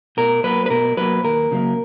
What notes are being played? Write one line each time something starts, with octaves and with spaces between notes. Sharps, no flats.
B2 A#4
F#3 A#3 B4
B4
B2 A#4
F#3 A#3 B4
D#2 A#4
C#3 F#3 A#3